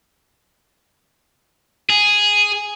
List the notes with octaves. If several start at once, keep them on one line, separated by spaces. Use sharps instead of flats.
G#4